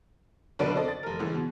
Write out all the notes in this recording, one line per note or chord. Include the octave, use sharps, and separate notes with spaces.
B1 D3 D4 B4 D5 D7
C4 A4 D5 D#5
A6
F1 A#4
G#2 C#3 E3 G#3
B2